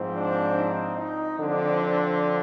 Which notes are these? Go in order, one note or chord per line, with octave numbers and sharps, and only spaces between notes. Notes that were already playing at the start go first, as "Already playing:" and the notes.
Already playing: G#2 F3 C4
D4
D#4
D#4
D3 F3 C4 D4